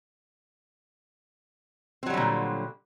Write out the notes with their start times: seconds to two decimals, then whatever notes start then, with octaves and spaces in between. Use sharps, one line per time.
2.03 C4
2.06 F#3
2.10 G3
2.14 D3
2.17 A#2